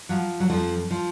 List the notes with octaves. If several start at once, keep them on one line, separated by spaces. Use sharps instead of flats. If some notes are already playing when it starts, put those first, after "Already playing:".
F3 F#3
F#3
F2 F3
F3